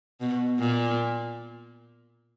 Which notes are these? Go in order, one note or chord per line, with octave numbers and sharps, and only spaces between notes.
B2
A#2